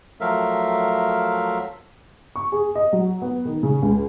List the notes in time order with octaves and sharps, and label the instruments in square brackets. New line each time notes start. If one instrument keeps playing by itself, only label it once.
[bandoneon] F3 F#3 A3 A#4 E5 F5
[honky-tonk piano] C#6
G#4
D#5
F#3
B3
D#3
C#3
C#2